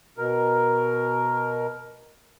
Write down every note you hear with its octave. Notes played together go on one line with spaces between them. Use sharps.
B2 A#4